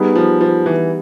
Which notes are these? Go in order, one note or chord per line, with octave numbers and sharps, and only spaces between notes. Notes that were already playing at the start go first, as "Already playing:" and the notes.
Already playing: G3 B3 D#4 G#4
F3
F3
E3